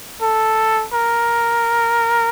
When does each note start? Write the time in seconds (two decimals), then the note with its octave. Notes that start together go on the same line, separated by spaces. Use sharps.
0.22 A4
0.93 A#4